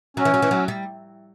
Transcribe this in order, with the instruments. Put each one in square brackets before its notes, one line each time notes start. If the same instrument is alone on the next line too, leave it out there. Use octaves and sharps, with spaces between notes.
[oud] F#3 [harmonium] C#4
[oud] E3
F#3
E3
F#3
G3